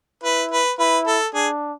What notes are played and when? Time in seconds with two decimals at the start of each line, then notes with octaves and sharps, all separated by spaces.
0.23 E4 B4
0.51 B4
0.79 E4 B4
1.07 A4
1.34 D4 G#4